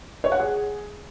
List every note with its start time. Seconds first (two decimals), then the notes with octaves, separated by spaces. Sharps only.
0.24 C#5
0.32 F#5
0.40 G#4